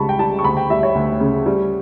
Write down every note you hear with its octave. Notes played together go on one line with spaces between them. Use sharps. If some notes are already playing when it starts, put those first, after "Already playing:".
Already playing: C#2 C#3 G3 A5 B5 C#6
G5
G3 A5
C#6
D2 B5
G5
G3 E5
C#5
D2
C#3
G3